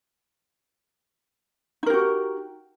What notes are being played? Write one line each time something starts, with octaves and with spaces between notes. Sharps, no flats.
D#4 F#4 G4 A#4